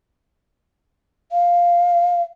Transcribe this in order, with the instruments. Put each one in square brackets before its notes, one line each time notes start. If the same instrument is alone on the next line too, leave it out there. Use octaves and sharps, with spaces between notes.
[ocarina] F5